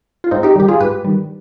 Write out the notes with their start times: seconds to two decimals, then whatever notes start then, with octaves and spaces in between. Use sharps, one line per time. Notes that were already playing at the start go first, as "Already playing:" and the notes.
0.24 F4
0.31 G#2 C4 D#4
0.43 D#4 G4
0.56 D#3 G3 G4
0.68 F4 G#4
0.80 G#2 G4 B4
1.05 D#3 G3